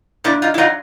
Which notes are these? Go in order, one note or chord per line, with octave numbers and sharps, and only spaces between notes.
A#2 D4 E4
D#4 F4
E4
F#3 D#4 F4